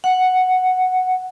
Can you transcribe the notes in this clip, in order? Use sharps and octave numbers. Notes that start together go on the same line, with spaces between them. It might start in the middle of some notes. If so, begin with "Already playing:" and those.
F#5